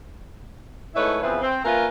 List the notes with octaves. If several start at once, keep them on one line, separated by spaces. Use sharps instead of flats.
G#2 A3 D#4 E4 B4 C#5
E2 C#3 F3 C4 B4 E5
C4
A#3 C#4 F4 A#4 B4 E5